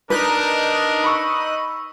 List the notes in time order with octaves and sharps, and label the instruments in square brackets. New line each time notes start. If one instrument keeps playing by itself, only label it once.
[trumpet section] D4 A#4 [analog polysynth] D#4 F#6 D#7 [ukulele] B4
[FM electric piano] B5 C#6 E6